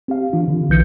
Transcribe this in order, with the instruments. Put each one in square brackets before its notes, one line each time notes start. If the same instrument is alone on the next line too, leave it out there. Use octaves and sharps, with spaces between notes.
[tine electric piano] C4 G4 F5
E3 D4 F4
D3
B1 E3 G6 C#7